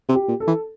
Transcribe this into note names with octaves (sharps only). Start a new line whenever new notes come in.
C3
G4
A#2
A4
E3